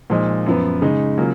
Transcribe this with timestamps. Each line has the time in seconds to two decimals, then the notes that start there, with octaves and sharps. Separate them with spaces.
0.10 A#2 F3 G#3 D#4
0.46 F#2 F3 B3
0.82 C#3 G#3 D#4
1.17 C#3 F#3 A#3 C#4 F4